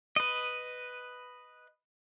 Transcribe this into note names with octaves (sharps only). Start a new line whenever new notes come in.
B4 D#5